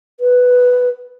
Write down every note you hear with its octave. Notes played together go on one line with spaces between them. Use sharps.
B4